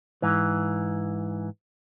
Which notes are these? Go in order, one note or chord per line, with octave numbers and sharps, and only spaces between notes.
G#2 E3